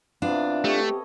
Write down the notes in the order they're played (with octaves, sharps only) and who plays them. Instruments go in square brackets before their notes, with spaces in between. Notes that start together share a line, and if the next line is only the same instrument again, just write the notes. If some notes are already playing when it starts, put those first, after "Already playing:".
[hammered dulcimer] C3 E3 B3 [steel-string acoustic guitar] D4 F4
[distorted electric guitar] A3 [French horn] G4 [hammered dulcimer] A4 C#5 D#5